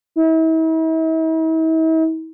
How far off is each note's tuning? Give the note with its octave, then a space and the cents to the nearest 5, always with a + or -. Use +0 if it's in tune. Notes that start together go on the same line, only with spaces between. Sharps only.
E4 -45